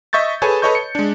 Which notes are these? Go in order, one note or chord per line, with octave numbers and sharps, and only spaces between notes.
D#5 E5 C#6 G6 A6
G#4 A4 B4 C#5 G#5 A5
A4 B4 C#5 D#5 C#6 G6
C#7
G#3 D4